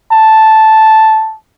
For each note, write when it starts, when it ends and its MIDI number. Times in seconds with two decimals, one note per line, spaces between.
0.12 1.35 81